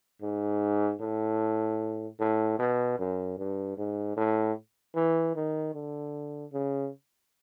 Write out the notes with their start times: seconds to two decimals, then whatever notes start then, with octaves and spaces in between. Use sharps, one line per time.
0.22 G#2
1.01 A2
2.20 A2
2.59 B2
2.99 F#2
3.38 G2
3.78 G#2
4.17 A2
4.96 E3
5.36 D#3
5.75 D3
6.53 C#3